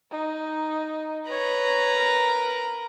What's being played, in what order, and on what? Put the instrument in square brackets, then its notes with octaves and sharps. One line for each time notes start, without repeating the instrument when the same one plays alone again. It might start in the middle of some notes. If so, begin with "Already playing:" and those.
[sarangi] D#4
[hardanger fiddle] B4 A#5 [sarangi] C#5
[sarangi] A#4